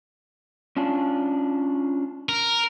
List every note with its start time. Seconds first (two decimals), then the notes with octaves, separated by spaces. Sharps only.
0.77 C#4 D4 F4
2.29 A#4